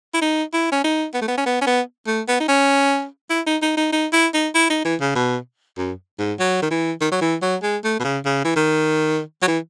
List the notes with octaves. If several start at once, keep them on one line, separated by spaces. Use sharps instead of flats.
E4
D#4
E4
C#4
D#4
B3
A3
B3
C#4
B3
C#4
B3
A3
B3
D#4
C#4
E4
D#4
D#4
D#4
D#4
E4
D#4
E4
D#4
E3
C#3
B2
F#2
G#2
F#3
D#3
E3
D#3
F#3
E3
F#3
G#3
A3
B2
C#3
C#3
E3
D#3
F#3
E3